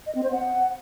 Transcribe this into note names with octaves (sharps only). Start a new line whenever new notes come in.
D#5
C4
C5
F#5